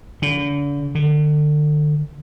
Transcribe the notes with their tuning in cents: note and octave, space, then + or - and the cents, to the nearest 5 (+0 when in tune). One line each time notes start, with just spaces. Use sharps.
D3 -40
D3 +35